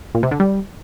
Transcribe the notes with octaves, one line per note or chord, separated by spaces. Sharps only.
A#2
C3
D3
G3